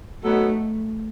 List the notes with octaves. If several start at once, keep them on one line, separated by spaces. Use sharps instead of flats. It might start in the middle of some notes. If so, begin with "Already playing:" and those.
F#3 A3 B3 D#4 F#4 A4